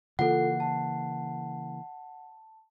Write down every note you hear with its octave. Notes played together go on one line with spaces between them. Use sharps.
C#3 E3 A#3 F4 A4 F#5
A5